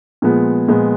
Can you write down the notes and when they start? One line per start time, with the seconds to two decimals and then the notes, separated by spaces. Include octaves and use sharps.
0.22 A#2 F3 G#3 B3
0.68 A#2 F3 G#3 B3